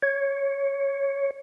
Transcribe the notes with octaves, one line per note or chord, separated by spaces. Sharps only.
C#5